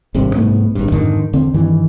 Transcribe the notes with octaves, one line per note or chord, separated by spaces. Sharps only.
G#1 G2 C3
C2 G#2 A3 B3
G#1 G2
F2 G#2 D3 D#3
E1 D3 C4
G2 D#3 E3